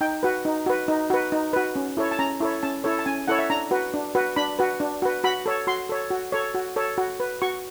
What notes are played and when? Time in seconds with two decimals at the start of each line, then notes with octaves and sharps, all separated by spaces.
0.01 D#4 G5
0.23 F#4 B4
0.45 D#4
0.66 F#4 B4
0.88 D#4
1.10 F#4 B4
1.32 D#4
1.53 F#4 B4
1.76 C#4
1.97 E4 A4 C#5
2.11 A5
2.19 C#4 A#5
2.40 E4 A4 C#5
2.63 C#4 A5
2.84 E4 A4 C#5
2.99 A5
3.06 C#4 G#5
3.28 E4 A4 C#5 F#5
3.39 E5
3.50 D4 A#5
3.71 F#4 B4
3.94 D4
4.15 F#4 B4
4.36 D4 B5
4.59 F#4 B4
4.80 D4
5.02 F#4 B4
5.24 F#4 B5
5.46 A4 C#5
5.67 F#4 C6
5.89 A4 C#5
6.11 F#4
6.32 A4 C#5
6.55 F#4
6.76 A4 C#5
6.98 F#4
7.20 B4
7.42 F#4 C#6